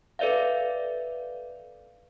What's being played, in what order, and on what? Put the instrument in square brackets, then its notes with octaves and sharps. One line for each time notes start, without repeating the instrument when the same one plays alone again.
[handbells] A4 B4 D5 E5 F5